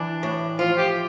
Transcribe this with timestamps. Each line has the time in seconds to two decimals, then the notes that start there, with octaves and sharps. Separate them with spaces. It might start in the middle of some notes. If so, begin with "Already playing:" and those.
Already playing: E3 D4
0.23 A2
0.59 F3 F4
0.77 G4